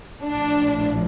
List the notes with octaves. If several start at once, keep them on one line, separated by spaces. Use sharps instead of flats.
A#1 A2 F3 D4